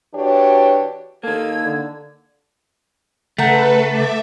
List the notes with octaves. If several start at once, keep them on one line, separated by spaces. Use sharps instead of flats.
E3 D4 F#4 G4 C#5
D#3 A#3 A4 E6 G#6
D3
C#3 A3 A4 B4 F#5 G5 A#5
E5 D6